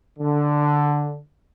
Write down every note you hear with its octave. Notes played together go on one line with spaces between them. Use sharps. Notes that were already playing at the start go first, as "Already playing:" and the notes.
D3